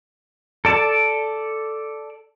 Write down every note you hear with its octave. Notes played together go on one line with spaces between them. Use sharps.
A4 D5 A5